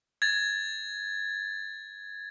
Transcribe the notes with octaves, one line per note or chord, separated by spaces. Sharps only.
G#6 A6